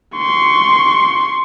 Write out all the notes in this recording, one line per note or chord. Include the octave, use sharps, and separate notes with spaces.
C6 C#6